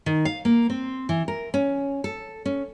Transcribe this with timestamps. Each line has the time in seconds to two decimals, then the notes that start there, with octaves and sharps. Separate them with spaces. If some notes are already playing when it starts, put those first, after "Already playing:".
0.06 D#3
0.25 F5
0.45 A#3
0.70 C4
1.09 E3
1.28 A#4
1.54 C#4
2.04 A4
2.46 C#4